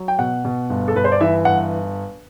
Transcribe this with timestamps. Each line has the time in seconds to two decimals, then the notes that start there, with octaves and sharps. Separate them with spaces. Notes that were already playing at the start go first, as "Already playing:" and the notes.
Already playing: F#3
0.08 G5
0.19 B2 F#5
0.45 B2
0.70 G1
0.88 A4
0.95 G1 B4
1.04 C5
1.12 D5
1.21 E3 E5
1.45 G1 F#5